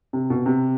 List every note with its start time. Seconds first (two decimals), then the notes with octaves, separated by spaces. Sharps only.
0.13 C3
0.30 B2
0.46 C3